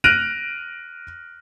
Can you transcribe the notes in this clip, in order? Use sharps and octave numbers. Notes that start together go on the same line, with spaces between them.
F6 F#6 A#6 D7 D#7 F7